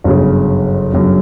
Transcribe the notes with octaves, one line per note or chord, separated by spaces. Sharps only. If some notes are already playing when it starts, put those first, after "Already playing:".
G1 F#2 C#3
G1 F#2 C#3